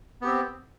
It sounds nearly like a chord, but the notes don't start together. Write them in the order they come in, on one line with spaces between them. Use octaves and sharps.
B3 G4 C4